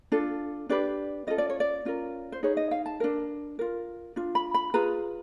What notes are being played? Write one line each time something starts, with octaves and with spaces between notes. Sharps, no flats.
D4 F4 A4
D4 G4 B4 D5
C#4 F4 A4 D#5
D5
C#5
D5
C#4 F4 A#4
C5
D#4 G#4 B4 C#5
D#5
F5
A5
D4 F#4 A#4
F4 A#4
D4 F4
B5
B5
F4 G#4 B4 A#5